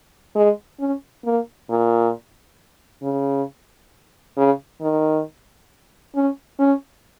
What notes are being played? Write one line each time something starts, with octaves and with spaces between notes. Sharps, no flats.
G#3
C#4
A#3
A#2
C#3
C#3
D#3
C#4
C#4